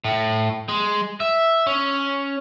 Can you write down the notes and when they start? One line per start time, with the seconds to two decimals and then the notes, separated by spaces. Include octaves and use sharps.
0.04 A2
0.69 G#3
1.20 E5
1.67 C#4